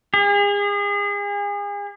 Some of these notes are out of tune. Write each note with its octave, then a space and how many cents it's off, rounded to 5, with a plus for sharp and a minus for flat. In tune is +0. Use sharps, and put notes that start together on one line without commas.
G#4 -35